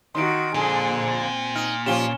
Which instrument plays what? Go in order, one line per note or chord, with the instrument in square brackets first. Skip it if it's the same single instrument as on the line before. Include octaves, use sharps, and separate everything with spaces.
[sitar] D#3 [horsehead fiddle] D#4 F#4 [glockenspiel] C6 D7
[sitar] F2 D3 [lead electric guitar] A#2 [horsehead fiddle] G#4
[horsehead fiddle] C4
[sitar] D#4 [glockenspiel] F6
[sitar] F3 F4 G4 [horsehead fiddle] C#4 [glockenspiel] E7 G7